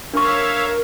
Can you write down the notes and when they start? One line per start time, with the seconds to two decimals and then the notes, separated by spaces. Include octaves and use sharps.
0.14 D4 A#4 C#5 E5 F5 C#6